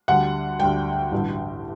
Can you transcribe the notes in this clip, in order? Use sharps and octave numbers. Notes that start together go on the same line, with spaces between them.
D2 D3 G3 F#5
D2 D3 G3 G5
A1 G2 D3